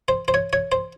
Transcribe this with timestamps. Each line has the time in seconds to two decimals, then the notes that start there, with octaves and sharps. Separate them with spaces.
0.08 C5
0.28 C5
0.34 C#5
0.53 C#5
0.72 C5